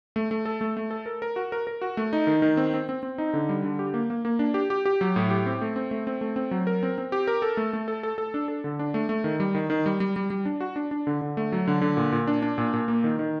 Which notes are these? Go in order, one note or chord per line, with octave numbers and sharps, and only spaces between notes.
A3
A3
A4
A3
A3
A4
A#4
A#4
F#4
A#4
A#4
F#4
A3
D#4
D#3
D#3
C4
C4
C4
C4
D#4
D3
G3
D3
G4
A#3
A#3
A#3
D4
G4
G4
G4
F#3
A2
G4
C4
A3
C4
A3
C4
A3
C4
F#3
A#4
C4
C4
G4
A#4
A4
A3
A3
A4
A4
A4
D4
A4
D3
D4
A3
A3
D#3
G3
D#3
D#3
G3
G3
G3
G3
D4
F#4
D4
D4
D3
D3
A3
F#3
D3
D3
A#2
A#2
D4
D4
A#2
A#2
A#3
D#3
D#3